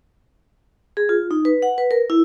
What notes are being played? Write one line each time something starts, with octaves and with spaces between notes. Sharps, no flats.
G#4
F4
D#4
B4
F#5
B4
A#4
E4